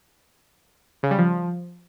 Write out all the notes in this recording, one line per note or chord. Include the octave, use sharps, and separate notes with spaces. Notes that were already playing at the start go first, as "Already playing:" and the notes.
C#3
G3
F3